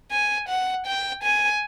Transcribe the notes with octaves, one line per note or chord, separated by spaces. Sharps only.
G#5
F#5
G5
G#5